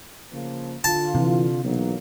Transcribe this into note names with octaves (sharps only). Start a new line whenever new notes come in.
C#3 F3 A#3
D3 F4 A5
C3 E3
B1 E3 F#3 A#3